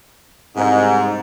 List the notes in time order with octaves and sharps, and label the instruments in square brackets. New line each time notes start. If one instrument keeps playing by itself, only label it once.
[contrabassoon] C2 [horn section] G#2